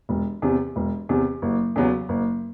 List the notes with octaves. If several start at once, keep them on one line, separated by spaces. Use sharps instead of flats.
E1
E2 C3
E1
E2 C3
F#1
E2 C#3 F#3 B3
F#1